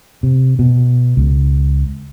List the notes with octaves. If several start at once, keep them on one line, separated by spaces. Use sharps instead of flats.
C3
B2
C#2